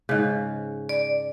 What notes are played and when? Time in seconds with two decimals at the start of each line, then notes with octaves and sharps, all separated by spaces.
0.09 G#2 C#3
0.89 D5